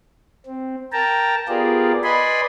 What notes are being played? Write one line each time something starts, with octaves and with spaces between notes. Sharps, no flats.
C4
A#4 G5 A5 A#5
B3 F4 G4 G#4 A#4 D5
B4 D5 D#5 G#5 B5 C6